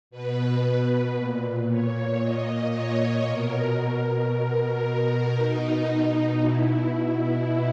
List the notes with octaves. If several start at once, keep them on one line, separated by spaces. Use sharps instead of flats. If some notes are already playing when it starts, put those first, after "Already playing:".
B2 B4
A#2
C#5
A#2 D#5
C#5
B2 A#4
B2 A#4
B2 D#4
B2 E4